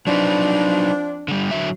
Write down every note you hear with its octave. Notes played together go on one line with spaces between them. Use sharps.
F3 F#3 C4 D4 D#4 B4
D3 G3
D3 F#3 E5